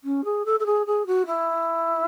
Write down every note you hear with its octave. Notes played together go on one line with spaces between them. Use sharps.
C#4
G#4
A4
A4
G#4
G#4
F#4
E4